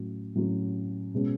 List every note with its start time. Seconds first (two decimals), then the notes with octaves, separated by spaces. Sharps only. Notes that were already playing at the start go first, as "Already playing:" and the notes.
Already playing: A2 F#3 A3 C#4 F#4
0.35 A2 F#3 A3 C#4 F#4
1.14 B2 G#3 C#4